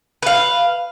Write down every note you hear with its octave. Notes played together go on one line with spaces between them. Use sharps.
B4 F5